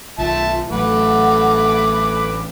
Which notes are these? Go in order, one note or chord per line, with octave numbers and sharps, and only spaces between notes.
B1 D#3 F4 E5 A5
A1 F#3 A3 A4 B4 F#5 D6